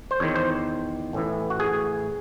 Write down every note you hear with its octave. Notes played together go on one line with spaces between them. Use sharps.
C5
E2 D#3 C#5
C5
A1 A2 E3
F#4
G#4